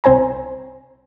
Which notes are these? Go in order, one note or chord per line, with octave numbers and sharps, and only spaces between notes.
C2 C4 C5 G#5 A#5